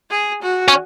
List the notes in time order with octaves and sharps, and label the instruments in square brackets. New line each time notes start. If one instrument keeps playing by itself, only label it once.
[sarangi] G#4
F#4
[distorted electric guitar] C#4